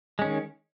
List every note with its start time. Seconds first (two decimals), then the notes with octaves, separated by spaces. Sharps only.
0.19 G#3
0.21 C#4
0.24 D#3